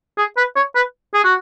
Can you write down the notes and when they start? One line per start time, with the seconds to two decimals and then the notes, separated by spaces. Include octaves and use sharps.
0.18 G#4
0.37 B4
0.56 C#5
0.75 B4
1.14 G#4
1.24 F#4